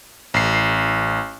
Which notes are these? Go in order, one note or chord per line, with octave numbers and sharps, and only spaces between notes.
A1 C7